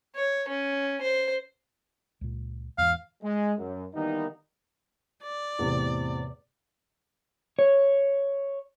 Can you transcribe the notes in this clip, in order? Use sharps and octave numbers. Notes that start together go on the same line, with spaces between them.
C#5
C#4
C5
C#2 A#2
E2 G#2 E3 F5
G#3
F#2
D#3 E3 G3 A#3 B3 D#4
D5
E2 A2 C3
C#5